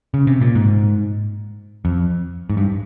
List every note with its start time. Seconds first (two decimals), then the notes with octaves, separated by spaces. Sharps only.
0.14 C#3
0.27 C3
0.41 A#2
0.55 G#2
1.85 F2
2.50 G#2
2.57 G2